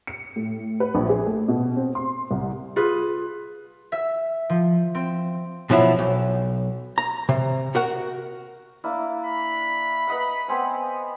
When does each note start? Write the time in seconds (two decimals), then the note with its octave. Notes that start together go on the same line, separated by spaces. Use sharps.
0.07 C#7
0.36 A2
0.80 B4
0.95 A#1
1.09 G#4
1.26 A3
1.48 B2
1.77 C4
1.95 C6
2.31 C2
2.76 F4 G#4 B4
3.92 E5
4.50 F3
4.95 C4
5.70 B2 F3 F#3 E4
5.99 B1
6.98 A#5
7.29 C3
7.75 F#4 A#4 F#5
8.84 A#3 D4 E4
9.25 B5
10.07 B4 D#5 F#5
10.48 B3 C4 G#5